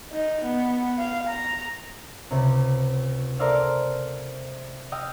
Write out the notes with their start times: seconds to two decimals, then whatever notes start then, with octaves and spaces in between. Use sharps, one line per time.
0.12 D#4
0.44 B3
0.98 F5
1.29 A#5
2.31 C#2 C3
3.39 A4 A#4 C5 D5 E5 F5
4.92 D#5 F5 G5 D#6 E6 D#7